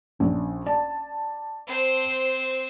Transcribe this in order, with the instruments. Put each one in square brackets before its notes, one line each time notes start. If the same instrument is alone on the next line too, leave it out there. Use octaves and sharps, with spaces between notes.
[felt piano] A#1 D4 [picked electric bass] C#4
[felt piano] D5 A5
[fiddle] C4 C5